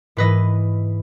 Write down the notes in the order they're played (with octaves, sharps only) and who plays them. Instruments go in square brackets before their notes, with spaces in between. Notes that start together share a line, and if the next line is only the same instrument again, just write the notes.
[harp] G#2 E3 B4 D#5